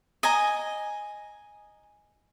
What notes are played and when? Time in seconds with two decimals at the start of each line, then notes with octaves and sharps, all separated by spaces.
0.23 D#5 G#5 A#5